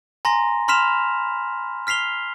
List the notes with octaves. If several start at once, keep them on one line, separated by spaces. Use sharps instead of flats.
G#5 A#5 C6 A#6
B5 C6 F6 B6 E7 F7
F6 B6 C7 F7 G7